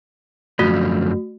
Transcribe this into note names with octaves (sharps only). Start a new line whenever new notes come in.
F#2 D3 F3 A3 F#4